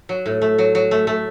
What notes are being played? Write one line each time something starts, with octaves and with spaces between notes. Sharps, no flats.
F#3
A2
A3
F#3
F#3
A3
A3